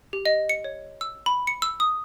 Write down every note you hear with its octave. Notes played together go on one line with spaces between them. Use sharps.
G4
D#5
C#7
C#5
E6
B5
C#7
E6
D#6